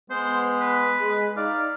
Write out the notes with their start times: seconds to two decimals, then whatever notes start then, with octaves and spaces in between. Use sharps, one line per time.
0.10 G#3 B3 C5
0.60 B4
1.00 G#3
1.37 D#4 D5 F5